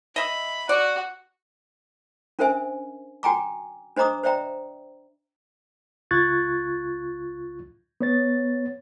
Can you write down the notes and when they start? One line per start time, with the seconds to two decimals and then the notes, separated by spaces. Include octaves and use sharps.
0.16 D#5 E5 B5
0.69 F#4 D5 F#5
2.39 C#4 D4 A#4 C5 E5 G#5
3.23 F#4 G5 G#5 A#5 D6
3.97 D4 C5 D#5 A#5 D6 D#6
4.23 C5 D5 E5 G5 A#5
6.11 C#2 F4 C#6 F#6 G#6 A6
8.01 B3 C#5 A6